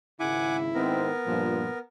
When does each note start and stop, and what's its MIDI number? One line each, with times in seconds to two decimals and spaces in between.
0.20 0.69 32
0.20 0.69 49
0.20 1.16 64
0.20 0.57 78
0.20 0.57 80
0.20 0.57 86
0.74 1.10 44
0.74 1.10 51
0.74 1.79 59
0.74 1.10 60
0.74 1.79 70
1.26 1.67 43
1.26 1.68 46
1.26 1.67 53